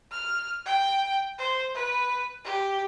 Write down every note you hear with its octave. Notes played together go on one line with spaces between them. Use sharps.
F6
G5
C5
B4
G4